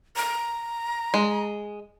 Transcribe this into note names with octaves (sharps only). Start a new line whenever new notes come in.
A#5
G#3